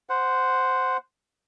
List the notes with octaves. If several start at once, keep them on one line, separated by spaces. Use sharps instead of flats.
C5 F#5